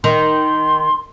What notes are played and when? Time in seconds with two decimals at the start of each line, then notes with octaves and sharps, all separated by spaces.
0.04 D#3 C6